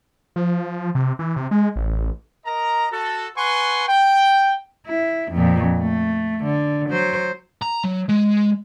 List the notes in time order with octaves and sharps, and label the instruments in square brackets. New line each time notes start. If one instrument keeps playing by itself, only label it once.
[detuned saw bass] F3
C3
E3
C3
G#3
A1
[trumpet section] A#4 D#5 A#5
F#4 A4
B4 F#5 G#5 C6 C#6
G5
[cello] E4
F2 A#2
A3
D3
F#3 C5
[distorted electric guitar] A#5
F#3
G#3